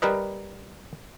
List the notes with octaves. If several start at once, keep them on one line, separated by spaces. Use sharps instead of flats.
G3 A#4 B4 D#5